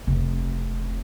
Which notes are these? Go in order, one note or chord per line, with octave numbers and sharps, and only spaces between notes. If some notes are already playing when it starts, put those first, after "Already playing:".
F1 C3